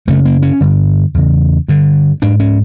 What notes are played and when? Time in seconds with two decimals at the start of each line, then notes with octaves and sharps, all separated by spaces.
0.07 F#2 C#3 A3
0.25 A#3
0.42 C#4
0.61 G2 D3
1.14 E2 C#3
1.68 G2 D3
2.22 G#2 D4
2.40 C#4